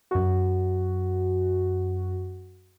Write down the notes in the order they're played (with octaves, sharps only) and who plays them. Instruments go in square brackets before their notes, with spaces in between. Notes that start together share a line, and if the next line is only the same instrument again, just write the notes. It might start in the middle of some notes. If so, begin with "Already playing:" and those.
[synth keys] F#2 F#4